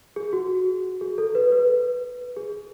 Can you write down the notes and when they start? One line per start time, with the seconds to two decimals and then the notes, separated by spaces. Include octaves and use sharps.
0.16 G#4
0.33 F#4
1.01 G#4
1.18 A4
1.35 B4
1.52 B4
2.37 G#4